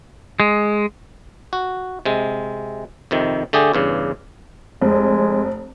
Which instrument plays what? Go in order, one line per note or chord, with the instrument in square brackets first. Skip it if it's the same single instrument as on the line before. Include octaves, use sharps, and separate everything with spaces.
[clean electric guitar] G#3
[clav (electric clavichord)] F#4
C3 G#3
F2 C3 D#3
D3 A3 G4 G#4
E2 G2 C#3
[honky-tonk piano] F1 [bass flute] G#3